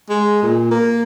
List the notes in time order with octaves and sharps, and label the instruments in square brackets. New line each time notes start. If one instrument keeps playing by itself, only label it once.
[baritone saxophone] G#3
A#2
A#3